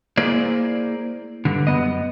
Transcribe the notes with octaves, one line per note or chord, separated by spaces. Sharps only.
A#3 E4 G#4 C5 D5
G2 D3
F#2 B3 D#5